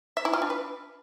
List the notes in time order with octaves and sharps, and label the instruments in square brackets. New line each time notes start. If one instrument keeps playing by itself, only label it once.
[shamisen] E5
E4
F4
D4
B4